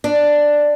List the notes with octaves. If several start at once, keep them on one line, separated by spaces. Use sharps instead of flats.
D4